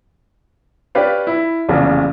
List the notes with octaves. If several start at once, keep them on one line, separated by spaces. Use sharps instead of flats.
D4 G4 B4 C#5 D5 F5
E4
F1 A#1 E2 C#3